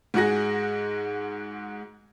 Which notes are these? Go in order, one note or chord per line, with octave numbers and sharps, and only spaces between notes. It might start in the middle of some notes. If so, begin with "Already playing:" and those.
G#2 G#3 F#4 G#4 A#6